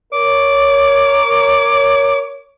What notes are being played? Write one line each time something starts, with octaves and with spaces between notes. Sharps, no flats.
A#4 C#5 D6